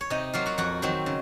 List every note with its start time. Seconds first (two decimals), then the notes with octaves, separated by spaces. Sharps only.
0.01 C#5
0.10 C3 D#4 D#5
0.33 F#3 A#3 F4 F5
0.46 F#4 F#5
0.58 F2 F#4 F#5
0.82 D#3 F#3 C4
1.06 C#3